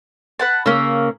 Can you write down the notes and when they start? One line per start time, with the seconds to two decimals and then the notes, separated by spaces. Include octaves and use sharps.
0.39 B4 F#5 A5
0.66 C#3 A#3 C#4 A#4 E6